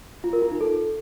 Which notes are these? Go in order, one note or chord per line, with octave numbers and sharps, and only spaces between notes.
F4
A#4
F4
D#4
A4